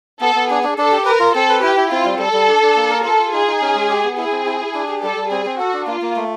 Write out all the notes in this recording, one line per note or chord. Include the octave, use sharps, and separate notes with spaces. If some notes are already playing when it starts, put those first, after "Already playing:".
B3 A4
B3
D4 G#4
D4
D4 A4
G4
A#4 B4
F4
C4 A4
B4
E4 G4
E4
C4 F4
G3
G3 A4
G3
D4
D4
A#3
A#4
F4 A4
F4
D#4 G#4
D#4
C#4
G#3
G4
B3
E4 G#4
C4
E4
E4
D4
G4
G3 A4
G3
C4 G#4
C4
F#4 A4
D4
A#3 F4
A#3
A3